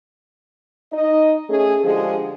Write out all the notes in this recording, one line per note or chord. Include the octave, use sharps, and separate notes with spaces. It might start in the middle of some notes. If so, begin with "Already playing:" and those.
D#4 D#5
A3 C#4 G#4
D3 F3 G#3 F4 G4 G#4